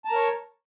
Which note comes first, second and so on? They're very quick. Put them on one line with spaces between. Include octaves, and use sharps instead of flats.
A5 A#5 A#4 C#5